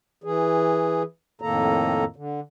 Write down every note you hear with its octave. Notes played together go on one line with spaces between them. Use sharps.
E3 G#4
F2 A2 D#3 A#3 A4 A#5
D3